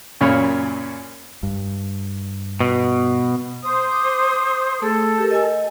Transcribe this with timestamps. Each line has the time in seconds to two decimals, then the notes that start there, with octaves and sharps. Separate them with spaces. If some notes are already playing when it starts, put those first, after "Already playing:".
0.21 F#2 A#2 C#3 C#5 B5 F6
1.43 G2
2.60 B2
3.62 C5 D#6
3.92 D6
4.82 A3 G#4 A4
5.18 G4 A#4
5.31 D#5 G#5